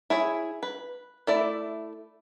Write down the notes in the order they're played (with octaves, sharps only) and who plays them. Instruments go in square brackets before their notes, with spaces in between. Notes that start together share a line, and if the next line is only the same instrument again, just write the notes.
[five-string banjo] E4 G#4 C#5
B4
A3 E4 D5